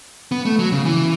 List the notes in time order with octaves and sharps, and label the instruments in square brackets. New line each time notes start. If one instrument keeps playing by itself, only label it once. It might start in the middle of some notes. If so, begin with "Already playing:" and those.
[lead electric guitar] B3
A3
F#3
C#3
E3